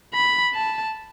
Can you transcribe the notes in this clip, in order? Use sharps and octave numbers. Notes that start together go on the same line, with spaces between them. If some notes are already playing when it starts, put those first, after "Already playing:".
B5
A5